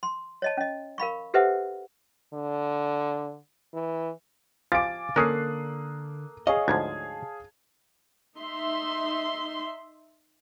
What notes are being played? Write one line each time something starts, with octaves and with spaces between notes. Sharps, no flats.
C6
C#5 D#5 A5
C#4 D#5
A#4 F5 B5 C#6
G4 A4 B4 C5 E5 F#5
D3
E3
F3 F4 G4 F5 G#5 D6 A6 D7
D3 A#3 C#4 A4 A#4 D#6 F#6 C7
G#4 C#5 D#5 F5 C#6
D2 G#2 F3 A5 G#6
D#4 E5 C6